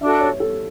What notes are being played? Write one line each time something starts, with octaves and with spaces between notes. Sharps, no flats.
D4 F#4 A4 E5
C#5
A4